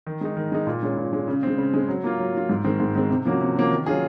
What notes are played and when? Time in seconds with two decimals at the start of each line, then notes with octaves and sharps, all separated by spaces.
0.07 D#3
0.21 G#3 D#4
0.37 D#3
0.52 G#3 D#4
0.67 A#2
0.83 G#3 C#4
0.97 A#2
1.13 G#3 C#4
1.28 C#3
1.43 G#3 C4
1.58 C#3
1.74 G#3 C4
1.88 F#3
2.04 A#3 F4
2.19 F#3
2.34 A#3 F4
2.49 G#2
2.64 D#3 G#3 C4
2.80 G#2
2.95 D#3 G#3 C4
3.10 C3
3.25 F3 A#3 C#4 F#4
3.41 C3
3.56 F3 A#3 C#4 F#4
3.71 D#3
3.86 F#3 C#4 F4 G#4